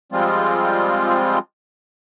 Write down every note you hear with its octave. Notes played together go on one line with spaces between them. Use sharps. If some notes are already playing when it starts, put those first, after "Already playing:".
F3 G3 G#3 C4 F4